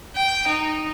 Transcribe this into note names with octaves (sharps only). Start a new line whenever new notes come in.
G5
D#4